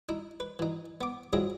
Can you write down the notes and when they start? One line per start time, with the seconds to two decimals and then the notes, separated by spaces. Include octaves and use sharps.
0.09 D#4 E4
0.40 B4
0.59 E3 D#4
1.01 B3 D6
1.33 F#3 C4 E4 F4 G#4 D#5